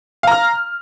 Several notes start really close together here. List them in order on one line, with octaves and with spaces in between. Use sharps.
F5 A#5 F6